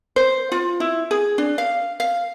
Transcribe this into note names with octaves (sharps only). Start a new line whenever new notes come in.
C5
F4
E4
G#4
D4
F5
F5